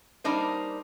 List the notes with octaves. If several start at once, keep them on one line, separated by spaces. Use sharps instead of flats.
G3 A#3 D4 D#4 C5